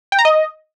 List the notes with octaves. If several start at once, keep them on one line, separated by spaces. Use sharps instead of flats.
G5
A#5
D#5